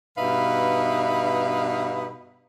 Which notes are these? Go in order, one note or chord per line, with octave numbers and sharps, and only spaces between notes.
G2 B2 D#4 B4 E5 F5